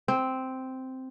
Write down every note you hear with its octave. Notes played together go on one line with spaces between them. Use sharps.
C4